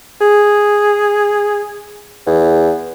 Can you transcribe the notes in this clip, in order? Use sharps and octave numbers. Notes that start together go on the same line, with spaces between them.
G#4
E2